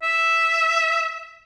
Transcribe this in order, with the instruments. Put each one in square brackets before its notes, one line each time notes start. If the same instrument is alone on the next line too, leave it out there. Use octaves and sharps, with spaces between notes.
[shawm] E5